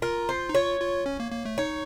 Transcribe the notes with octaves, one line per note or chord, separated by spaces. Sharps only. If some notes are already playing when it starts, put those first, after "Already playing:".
F4 A#4
C5
D#4
F4 C#5
F4
C#4
A#3
A#3
A3
D#4 C#5